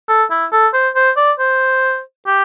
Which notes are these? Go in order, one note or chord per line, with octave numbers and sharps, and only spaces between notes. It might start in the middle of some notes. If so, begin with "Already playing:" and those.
A4
E4
A4
C5
C5
D5
C5
G4